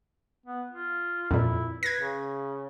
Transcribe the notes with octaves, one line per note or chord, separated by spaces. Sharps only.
B3
F4
F2 A#2 E4
B4 G#6 A#6
C#3